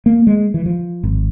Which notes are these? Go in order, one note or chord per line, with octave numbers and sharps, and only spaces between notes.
A#3
G#3
E3
F3
G#1